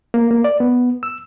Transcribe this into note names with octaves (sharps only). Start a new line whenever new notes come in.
A#3
A#3
D5
B3
E6